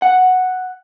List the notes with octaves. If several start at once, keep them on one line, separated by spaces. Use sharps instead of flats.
F#5